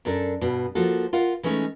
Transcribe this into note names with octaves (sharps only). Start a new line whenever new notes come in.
F#2 D4 A4 A#4
G2 B2
F3 A#3 F#4 A4
F4 A#4 F5 F#5
E3 G#3 A3 C#4 D#4